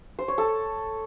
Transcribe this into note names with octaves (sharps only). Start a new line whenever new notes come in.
C5
C#5
A4